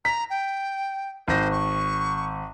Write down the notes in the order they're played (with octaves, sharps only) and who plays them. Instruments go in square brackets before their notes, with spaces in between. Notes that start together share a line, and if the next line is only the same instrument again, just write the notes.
[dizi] A#5 [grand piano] B6
[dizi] G5
[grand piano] G#1 A#6 [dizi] C5
[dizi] C#6